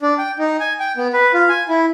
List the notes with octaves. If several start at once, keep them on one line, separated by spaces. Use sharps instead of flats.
D4
G5
D#4
G#5
G5
B3
B4
F4
G#5
E4